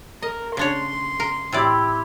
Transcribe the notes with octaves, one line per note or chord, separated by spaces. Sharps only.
A#4 D#5
C#3 D4 C#5 C6
A#4
A2 E3 C4 E4 G4 D5